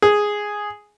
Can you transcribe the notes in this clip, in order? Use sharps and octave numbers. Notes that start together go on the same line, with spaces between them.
G#4